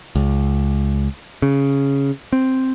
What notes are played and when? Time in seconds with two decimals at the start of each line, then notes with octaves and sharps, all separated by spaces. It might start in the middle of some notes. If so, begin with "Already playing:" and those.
0.15 C#2
1.42 C#3
2.33 C4